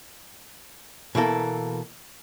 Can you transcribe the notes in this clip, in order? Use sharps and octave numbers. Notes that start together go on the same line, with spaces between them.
B2 E3 A#3 A4